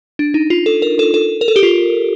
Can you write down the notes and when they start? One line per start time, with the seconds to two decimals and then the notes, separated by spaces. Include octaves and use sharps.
0.19 D4
0.34 D#4
0.50 F4
0.66 A4
0.82 A#4
0.99 A4
1.14 A4
1.41 A#4
1.48 A4
1.56 G4
1.63 F4